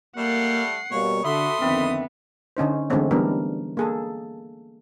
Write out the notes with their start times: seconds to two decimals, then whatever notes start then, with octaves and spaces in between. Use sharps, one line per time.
0.17 G3 A3 A#3 F#5 C7
0.91 B2 G3 A#3 C#5
1.24 D3 F#4 A4 E5 B5 C6 D#6
1.62 F2 D3 D#3 B3 C4 E5
2.57 D3 C#4 D#4 C5
2.90 D3 E3 G#3 A3 C4 C#4
3.11 E3 G3 B3 D4 A#4
3.77 A#3 G#4 A4